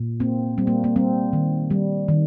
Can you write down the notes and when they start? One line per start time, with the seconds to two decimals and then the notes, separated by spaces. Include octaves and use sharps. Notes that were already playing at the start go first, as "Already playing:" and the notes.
Already playing: A#2
0.20 A#3 C4
0.58 G3 C4
0.67 A#3
0.84 A#3
0.96 G3 C4
1.33 D#3
1.70 G3
2.08 D#3